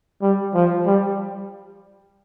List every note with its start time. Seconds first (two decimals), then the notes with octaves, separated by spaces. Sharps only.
0.22 G3
0.54 F3
0.86 G3